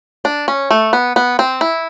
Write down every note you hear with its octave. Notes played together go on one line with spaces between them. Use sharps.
D4
C#4
A3
B3
B3
C4
E4